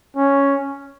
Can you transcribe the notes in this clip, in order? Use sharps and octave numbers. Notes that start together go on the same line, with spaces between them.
C#4